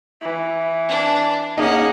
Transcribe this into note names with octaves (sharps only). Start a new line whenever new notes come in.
E3
D4
A#3 C#4 D#4 G#4 F#5